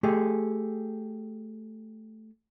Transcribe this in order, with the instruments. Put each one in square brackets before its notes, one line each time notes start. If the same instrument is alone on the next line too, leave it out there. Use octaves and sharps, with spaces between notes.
[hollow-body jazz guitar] A3 G4 G#4